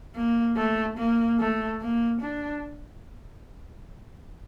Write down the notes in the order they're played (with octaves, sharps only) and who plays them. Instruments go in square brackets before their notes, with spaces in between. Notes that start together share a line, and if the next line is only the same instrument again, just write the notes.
[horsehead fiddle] A#3
A3
A#3
A3
A#3
D4